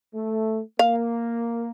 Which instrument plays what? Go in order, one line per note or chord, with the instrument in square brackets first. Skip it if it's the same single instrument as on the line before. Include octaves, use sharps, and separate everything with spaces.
[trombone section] A3
[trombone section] A#3 [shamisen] F5